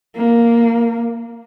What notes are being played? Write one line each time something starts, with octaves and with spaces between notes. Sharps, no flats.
A#3